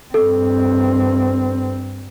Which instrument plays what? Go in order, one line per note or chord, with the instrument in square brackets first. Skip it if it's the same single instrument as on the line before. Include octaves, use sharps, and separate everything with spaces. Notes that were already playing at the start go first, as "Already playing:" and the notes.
[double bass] G2 C4 [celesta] A4